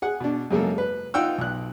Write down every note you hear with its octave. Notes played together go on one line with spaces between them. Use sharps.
G#4 F#5
B2 D4
F#2 C#3 G#3 A#3 A4
B4
D#4 F4 F#5 G5 E6
B1 F#6